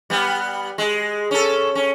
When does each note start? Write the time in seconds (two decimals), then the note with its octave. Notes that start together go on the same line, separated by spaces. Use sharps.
0.10 G3 B3
0.78 G#3
1.31 C#4 A4
1.75 C#4